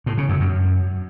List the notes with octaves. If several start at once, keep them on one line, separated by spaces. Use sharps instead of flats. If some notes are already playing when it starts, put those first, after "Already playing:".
A2
C#3
F#2
F#2